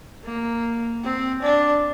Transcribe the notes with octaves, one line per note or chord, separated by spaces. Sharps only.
A#3
C4
D4